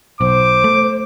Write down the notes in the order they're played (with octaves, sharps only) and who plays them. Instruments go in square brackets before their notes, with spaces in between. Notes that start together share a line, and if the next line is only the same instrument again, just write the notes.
[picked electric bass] B1 [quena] C5 [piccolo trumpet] D6
[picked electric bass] A3